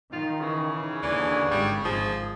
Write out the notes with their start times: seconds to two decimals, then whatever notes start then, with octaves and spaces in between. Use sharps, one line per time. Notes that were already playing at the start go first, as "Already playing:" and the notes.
0.11 D#3 D#4 F4
0.40 C#3 E3
1.03 D#2 D3 E3 D4
1.51 G#1 G3
1.84 G#1 F3 G#4